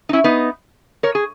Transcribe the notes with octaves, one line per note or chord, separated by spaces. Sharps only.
D#4
C#4 E4
B3 D#4
A#4 C#5
G#4